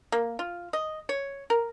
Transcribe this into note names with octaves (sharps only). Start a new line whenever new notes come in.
A#3
F4
D#5
C#5
A#4